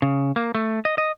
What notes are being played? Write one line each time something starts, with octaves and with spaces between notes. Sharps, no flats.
C#3
A#3
A3
D#5
D#5